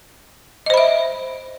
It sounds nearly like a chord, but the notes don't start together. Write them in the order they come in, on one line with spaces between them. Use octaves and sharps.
D#5 C5 B5 E5